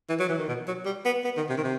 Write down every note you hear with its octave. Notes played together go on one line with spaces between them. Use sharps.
E3
F#3
E3
D#3
B2
F#3
G3
B3
B3
D#3
C3
D#3
C3